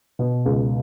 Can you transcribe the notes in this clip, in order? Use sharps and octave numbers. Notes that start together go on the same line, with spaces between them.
B2
C#2